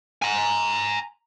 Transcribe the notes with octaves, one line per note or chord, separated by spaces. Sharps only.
G#5 A#5